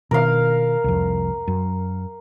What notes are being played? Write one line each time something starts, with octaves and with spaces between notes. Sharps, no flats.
B2 D#3 A#4 F5
C2 F2
F#2